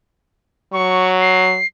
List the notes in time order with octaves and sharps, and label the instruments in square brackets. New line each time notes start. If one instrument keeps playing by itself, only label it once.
[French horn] F#3 [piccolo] C#6
[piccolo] C7